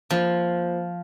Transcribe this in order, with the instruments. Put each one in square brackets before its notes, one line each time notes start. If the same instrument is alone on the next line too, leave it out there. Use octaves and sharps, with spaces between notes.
[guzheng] F3 [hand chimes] A#3 F4 C5